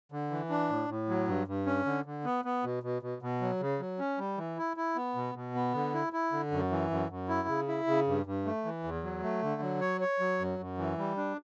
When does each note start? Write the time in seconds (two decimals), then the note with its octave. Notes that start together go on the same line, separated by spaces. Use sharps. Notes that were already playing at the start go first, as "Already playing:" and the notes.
0.12 D3
0.31 E3
0.50 D4
0.70 A2
0.89 A2
1.09 F#3
1.28 G2
1.47 G2
1.66 C#4
1.86 D3
2.06 D3
2.25 B3
2.45 B3
2.64 B2
2.83 B2
3.02 B2
3.22 B2
3.41 F#3
3.61 C#3
3.80 F#3
3.99 C#4
4.19 G3
4.38 E3
4.58 E4
4.77 E4
4.96 B3
5.15 B2
5.35 B2
5.55 B3
5.74 D3
5.93 E4
6.13 E4
6.32 D3
6.51 F#2
6.71 E3
6.90 F#2
7.10 F#2
7.29 E4
7.48 C#3
7.68 E4
7.87 C#3
8.07 G2
8.26 G2
8.45 A3
8.65 E3
8.84 E2
9.04 F#3
9.23 A3
9.42 D3
9.62 F#3
9.81 C#5
10.01 C#5
10.20 F#3
10.39 F#2
10.59 F#2
10.78 E3
10.98 G3
11.17 D4